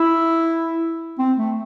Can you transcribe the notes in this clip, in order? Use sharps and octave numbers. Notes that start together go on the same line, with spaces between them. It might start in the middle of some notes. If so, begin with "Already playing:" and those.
Already playing: E4
C4
A3